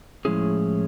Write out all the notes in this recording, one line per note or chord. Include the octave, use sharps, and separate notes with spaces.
A2 F3 G#3 C#4 E4 G#4